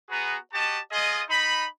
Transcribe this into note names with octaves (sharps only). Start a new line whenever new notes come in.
B3 F#4 G#4 B4 A#5
F#4 G4 D#5 A5
F4 G#4 D#5
D#4 B5